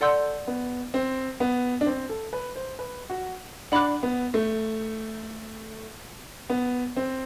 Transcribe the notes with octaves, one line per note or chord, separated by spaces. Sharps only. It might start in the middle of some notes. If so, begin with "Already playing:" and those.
A4 D5 F#5 C6 E6 G6
B3
C4
B3
D4
C4
A4
B4
C5
B4
F#4
D4 F#5 B5 D6 F#6
B3
A3
B3
C4